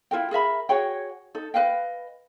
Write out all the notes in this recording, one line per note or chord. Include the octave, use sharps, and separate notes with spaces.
E4 F4 A#4 G5
G#4 A#4 E5 B5
F#4 G#4 C#5 G5
D#4 A4
B4 D#5 F5 G5